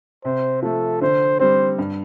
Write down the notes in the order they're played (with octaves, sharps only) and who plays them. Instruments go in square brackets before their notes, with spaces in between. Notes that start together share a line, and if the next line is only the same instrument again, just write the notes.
[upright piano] C3 [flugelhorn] C5
[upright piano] F3 A3 [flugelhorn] A4
[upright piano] D3 [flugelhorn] C5
[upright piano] G3 C4 [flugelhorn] C5
[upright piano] G2